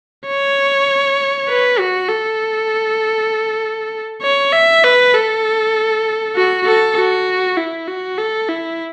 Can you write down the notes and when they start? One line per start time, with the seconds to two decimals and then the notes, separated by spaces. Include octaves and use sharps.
0.27 C#5
1.49 B4
1.79 F#4
2.09 A4
4.23 C#5
4.52 E5
4.84 B4
5.14 A4
6.35 F#4
6.66 A4
6.97 F#4
7.57 E4
7.88 F#4
8.18 A4
8.49 E4